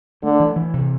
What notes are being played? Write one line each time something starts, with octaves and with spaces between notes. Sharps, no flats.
D3 A3
E3
E3
C3